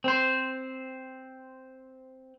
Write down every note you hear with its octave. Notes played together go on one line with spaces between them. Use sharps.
C4 C5